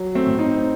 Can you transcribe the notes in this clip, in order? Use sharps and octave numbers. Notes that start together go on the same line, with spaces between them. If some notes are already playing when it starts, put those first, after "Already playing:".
Already playing: F#3
A3 C4
A2
C4 D#4